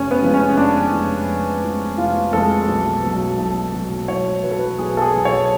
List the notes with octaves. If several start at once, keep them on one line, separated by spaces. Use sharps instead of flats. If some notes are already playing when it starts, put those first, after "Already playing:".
Already playing: F1 C#4
B3
F2 F3 G#3
C#4
F1 D4
F2 F3 G#3
F1
F2 F3 G#3
F1 F4
F2 F3 G#3 A4
B1
B2 F#3
B1
B2 F#3
B1 C#5
B2 F#3 B4
A4
B4
B1 G#4
A4
G#4
B2 F#3
C#5